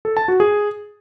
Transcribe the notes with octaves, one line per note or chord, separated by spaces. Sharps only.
A4
A5
F#4
G#4